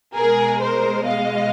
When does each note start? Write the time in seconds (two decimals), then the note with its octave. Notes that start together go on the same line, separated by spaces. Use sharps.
0.16 B2 G#3 G#4 A#4
0.61 A#4 C5
1.06 D#5 F5